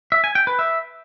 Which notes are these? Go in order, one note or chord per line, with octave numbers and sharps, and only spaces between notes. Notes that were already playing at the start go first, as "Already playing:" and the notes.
E5
G#5
G5
B4
E5